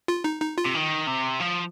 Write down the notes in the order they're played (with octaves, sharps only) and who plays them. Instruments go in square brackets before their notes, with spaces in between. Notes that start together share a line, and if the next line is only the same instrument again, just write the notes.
[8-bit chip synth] F4
D#4
D#4
F4
[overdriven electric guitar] C3
D#3
C3
F3